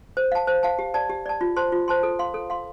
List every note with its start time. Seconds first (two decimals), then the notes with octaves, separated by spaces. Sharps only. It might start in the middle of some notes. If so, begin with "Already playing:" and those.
0.17 C5
0.32 F5 A5
0.47 C5
0.63 F5 A5
0.79 G4
0.94 D5 A5
1.10 G4
1.26 D5 A5
1.41 F4
1.56 C5 A5 C6
1.72 F4
1.88 C5 A5 C6
2.03 A4
2.19 F5 C6
2.34 A4
2.50 F5 C6